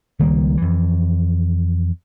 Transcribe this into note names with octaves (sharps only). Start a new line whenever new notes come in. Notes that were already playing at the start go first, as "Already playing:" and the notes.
C#2 D#3 G3 A#3
F2 E3